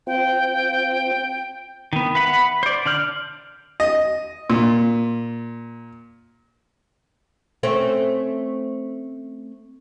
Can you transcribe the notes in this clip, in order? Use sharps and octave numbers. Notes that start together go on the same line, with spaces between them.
C4 F4 G5
D#3 B3
B4 E5 F#5 B5
C5 D5
D3 D5 F6 G6
D#5
A#2
A3 C4 C#4